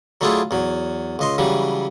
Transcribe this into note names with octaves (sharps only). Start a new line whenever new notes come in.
F#3 A3 D4 E4 F4 G#4
E2 F#3
C#2 D#5 C6
C#3 E3 F#3 G3